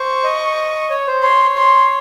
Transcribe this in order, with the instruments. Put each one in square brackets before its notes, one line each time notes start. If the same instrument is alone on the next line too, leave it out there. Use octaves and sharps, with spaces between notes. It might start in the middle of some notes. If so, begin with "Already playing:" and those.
Already playing: [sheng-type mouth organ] C5 [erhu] C#6
[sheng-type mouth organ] D#5
C#5
C5
[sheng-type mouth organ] C#5 [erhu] C6
[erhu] C6